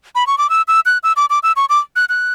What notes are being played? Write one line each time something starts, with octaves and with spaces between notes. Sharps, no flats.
B5
C#6
D6
E6
E6
F#6
E6
D6
D6
E6
C#6
D6
F#6
F#6